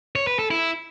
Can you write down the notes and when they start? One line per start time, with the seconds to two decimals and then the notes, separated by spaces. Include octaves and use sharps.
0.15 C#5
0.27 B4
0.39 A4
0.51 E4